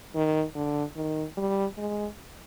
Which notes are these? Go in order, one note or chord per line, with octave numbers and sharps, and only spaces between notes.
D#3
D3
D#3
G3
G#3